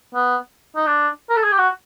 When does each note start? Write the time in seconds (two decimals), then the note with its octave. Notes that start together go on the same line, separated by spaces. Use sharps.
0.14 B3
0.76 D#4
0.87 D4
1.30 A#4
1.37 A4
1.44 G#4
1.52 G4
1.58 F#4